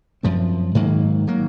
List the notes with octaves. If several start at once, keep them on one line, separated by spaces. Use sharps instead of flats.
F#2 F3 C4
G#2 D#3 F#3 A#3
D#3 F#3 A#3